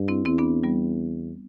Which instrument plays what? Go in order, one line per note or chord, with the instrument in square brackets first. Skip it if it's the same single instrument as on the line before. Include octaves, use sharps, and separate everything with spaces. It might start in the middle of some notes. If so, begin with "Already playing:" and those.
Already playing: [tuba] G2
[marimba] C4 E4
[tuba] E2 [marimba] C4 E4
[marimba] B3 D4
G3 B3